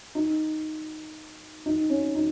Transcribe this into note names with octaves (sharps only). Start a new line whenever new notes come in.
D#4
D#4
C#4
D#4